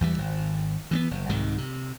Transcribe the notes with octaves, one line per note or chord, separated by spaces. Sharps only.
E2 E3 G3
G#1
E3 A#3 B3
F#1
C2 G#2 C3 D#3
C3